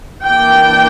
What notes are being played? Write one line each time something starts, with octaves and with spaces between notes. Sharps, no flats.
E3 A#3 D4 G5